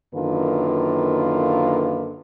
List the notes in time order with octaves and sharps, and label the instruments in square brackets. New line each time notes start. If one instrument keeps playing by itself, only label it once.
[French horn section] F#2 D3 D#3 A#3 F4 B4